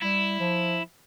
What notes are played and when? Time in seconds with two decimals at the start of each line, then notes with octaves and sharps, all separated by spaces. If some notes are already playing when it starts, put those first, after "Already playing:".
0.02 G3 E4
0.40 F3